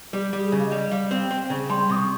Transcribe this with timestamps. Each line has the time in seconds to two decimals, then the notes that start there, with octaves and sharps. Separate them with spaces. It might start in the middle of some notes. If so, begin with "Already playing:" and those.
0.13 G3 G4
0.33 G3
0.39 G#4
0.52 C#3
0.58 F5
0.65 D#5
0.72 G3
0.91 G3 F5
1.11 C4
1.17 G5
1.31 C4
1.43 G5
1.50 C#3
1.70 G3 C6
1.89 C3 D#6
1.96 C#6